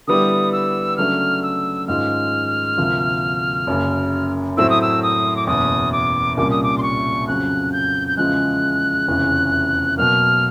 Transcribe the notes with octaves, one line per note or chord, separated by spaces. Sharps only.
D3 G3 B3 E4 G4 D#6
E6
C#3 F#3 A3 D4 F6
E6
G#2 D#3 G#3 C#4 F4 F6
D2 C3 F3 A#3
F#1 F#2 C#3
A2 F#3 A3 C4 E4 E6
D#6
E6
D#6
D6
F#1 E2 B2 D#6
D6
C2 A#2 G3 A#3 C#4 D6
D#6
D6
C6
C#6
F2 C#3 F#3 F#6
G6
G6
E2 C#3 F3 G#3 F#6
F1 E2 C#3 E3
B2 F#3 A#3 F6